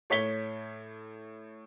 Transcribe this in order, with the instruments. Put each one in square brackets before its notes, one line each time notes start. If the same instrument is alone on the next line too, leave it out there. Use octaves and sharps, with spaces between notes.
[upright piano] A2 C#5 B6 G7